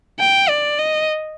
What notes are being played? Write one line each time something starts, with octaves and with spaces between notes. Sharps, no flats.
G5
D5
D#5